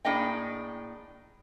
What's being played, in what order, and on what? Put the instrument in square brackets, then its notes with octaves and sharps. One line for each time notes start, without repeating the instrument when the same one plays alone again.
[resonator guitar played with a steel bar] A2 A#3 D4 G#4 D#5 G5